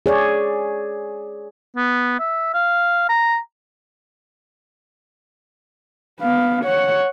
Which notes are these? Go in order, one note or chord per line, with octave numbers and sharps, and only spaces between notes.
G#4 C#5 D5
B3
E5
F5
A#5
B3 F5
C#5 F#5